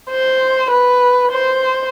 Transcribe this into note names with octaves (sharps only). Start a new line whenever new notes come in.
C5
B4
C5